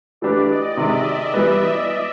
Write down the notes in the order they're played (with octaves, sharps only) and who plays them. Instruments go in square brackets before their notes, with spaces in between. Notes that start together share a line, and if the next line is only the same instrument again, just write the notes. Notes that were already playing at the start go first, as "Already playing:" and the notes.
[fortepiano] E3 A3 D4 G4 B4 [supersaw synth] D5
[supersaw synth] D#5
[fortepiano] C3 D#3 G#3 [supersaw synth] E5
[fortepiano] E3 G3 B3